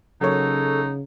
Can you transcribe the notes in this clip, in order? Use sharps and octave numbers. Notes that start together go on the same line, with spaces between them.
C#3 F#3 A#3 D#4 A4 C#5